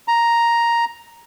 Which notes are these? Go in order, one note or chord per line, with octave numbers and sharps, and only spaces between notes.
A#5